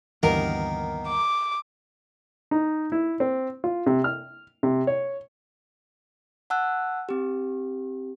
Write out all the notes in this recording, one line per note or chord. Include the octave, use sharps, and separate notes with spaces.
D2 G2 D#3 E3 A#3 B3 A#4
D6
D#4
E4
C4
F4
C3
F6
C3
C#5
F#5 A5 E6 F#6
C4 G4